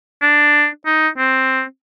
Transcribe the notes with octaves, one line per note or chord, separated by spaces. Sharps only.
D4
D#4
C4